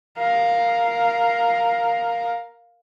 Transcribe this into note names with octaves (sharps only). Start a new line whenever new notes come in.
A#4 F5